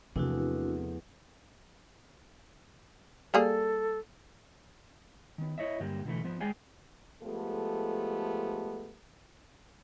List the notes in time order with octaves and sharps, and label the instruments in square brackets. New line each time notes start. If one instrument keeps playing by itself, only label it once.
[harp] E2 F3 A3 [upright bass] C3 [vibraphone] D4 E4 F#4
[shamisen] G3 A#3 G#4 [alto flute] A4
[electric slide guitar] D#3 B3
E4 C#5 D#5 E5
G2 D3 F#3 A#3 G4
B2 D3 E3 A3
F3 B3
G#3 G#4 D5 F5 G5 G#5
[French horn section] F3 G#3 A3 B3 G4 A4